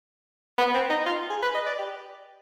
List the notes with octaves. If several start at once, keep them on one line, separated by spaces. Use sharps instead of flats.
B3
C4
D#4
F4
G#4
B4
D#5
D5
G4